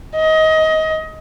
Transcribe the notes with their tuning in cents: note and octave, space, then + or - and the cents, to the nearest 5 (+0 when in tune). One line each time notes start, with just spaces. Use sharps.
D#5 +20